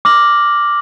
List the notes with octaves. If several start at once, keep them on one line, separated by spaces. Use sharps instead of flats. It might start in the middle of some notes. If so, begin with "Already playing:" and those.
D6 F6 A#6 F#7